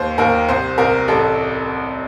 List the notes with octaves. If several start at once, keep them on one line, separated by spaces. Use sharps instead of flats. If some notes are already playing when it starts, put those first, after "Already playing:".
Already playing: D#2 C5
D#2 A#4
C2 C5
C2 A#4
A1 A4